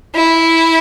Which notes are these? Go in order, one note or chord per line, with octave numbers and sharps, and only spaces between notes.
E4